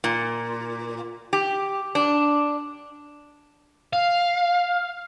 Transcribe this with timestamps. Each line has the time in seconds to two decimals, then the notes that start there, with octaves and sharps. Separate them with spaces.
0.04 A#2
1.33 G4
1.95 D4
3.93 F5